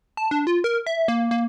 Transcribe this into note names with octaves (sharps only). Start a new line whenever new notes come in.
A5
D4
F4
A#4
E5
A#3
A#3